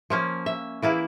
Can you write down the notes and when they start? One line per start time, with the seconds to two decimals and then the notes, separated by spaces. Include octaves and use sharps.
0.10 F3 A#3 C#4
0.46 E5
0.82 E3 A#3 E4 G#4